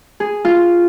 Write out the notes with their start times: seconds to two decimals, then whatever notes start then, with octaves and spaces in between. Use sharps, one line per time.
0.20 G#4
0.45 F4